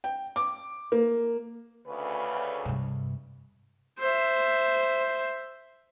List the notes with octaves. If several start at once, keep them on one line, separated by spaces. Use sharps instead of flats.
G5
D6
A#3
D2 C#3 B4
G2 C3
C5 E5